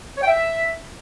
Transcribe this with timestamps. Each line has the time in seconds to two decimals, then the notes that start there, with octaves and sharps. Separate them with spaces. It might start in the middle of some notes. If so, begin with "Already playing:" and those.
0.18 C#5
0.23 G5
0.28 E5